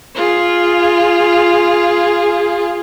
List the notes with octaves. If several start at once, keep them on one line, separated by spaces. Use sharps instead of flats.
F4 G#4